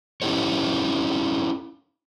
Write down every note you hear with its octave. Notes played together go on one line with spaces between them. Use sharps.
C#4 D#4 E4 G4 A4 C#5